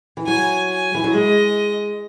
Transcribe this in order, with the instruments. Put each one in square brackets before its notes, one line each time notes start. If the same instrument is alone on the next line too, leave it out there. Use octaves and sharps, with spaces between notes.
[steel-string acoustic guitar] E3
[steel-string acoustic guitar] F#3 [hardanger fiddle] G#5
[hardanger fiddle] G#5
[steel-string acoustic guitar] E3
F#3
[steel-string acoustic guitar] G#3 [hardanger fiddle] D#5